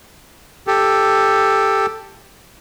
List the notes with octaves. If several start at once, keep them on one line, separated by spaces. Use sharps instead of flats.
G4 A4